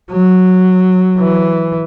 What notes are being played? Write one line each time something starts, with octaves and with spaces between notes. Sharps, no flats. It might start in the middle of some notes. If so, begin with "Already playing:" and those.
F#3
E3